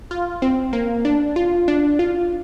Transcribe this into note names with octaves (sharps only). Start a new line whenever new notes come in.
F4
C4
A#3
D4
F4
D4
F4